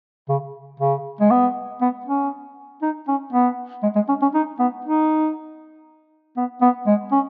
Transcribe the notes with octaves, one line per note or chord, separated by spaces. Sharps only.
C#3
C#3
G#3
B3
B3
C#4
D#4
C#4
B3
G#3
G#3
C#4
C#4
D#4
B3
D#4
B3
B3
G#3
C#4